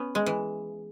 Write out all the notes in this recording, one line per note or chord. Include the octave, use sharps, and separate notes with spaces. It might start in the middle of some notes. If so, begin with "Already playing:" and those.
Already playing: B3 C#4
G#3
E3